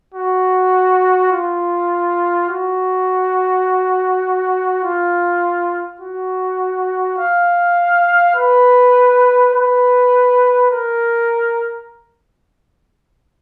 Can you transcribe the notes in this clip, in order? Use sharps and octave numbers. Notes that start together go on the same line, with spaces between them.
F#4
F4
F#4
F4
F#4
F5
B4
B4
A#4